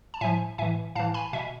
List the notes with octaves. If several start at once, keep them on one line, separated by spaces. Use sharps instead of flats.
A5
A2 F3 E5 G#5
A2 E3 E5 G#5
A2 E3 F5 A5
G#5 B5
B2 E5 G#5